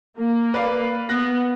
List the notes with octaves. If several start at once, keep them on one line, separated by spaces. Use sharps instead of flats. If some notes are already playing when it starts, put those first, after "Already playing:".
A#3
B4 D5 F5
B3 F#6 A#6